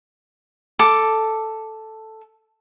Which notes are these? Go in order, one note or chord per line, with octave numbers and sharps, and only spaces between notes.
A4 D6